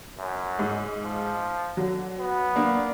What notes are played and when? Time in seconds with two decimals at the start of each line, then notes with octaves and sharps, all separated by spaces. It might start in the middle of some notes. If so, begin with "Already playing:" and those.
0.19 F#2
0.59 G#2
1.03 F3
1.77 D3 F#3
2.19 B3
2.55 A#3 D4